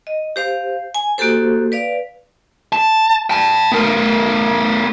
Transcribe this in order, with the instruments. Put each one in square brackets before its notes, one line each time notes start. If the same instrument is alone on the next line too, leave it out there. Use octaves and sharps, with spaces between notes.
[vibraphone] D#5
G4 C5 F5
G#5
A#3 F#4 G4 A4 C5
B4 D5 F5
[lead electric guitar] A5
G5 A5
B3 A#4